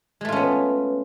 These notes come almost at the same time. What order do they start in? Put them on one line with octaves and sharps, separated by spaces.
G#3 A3 F4 C#4 B3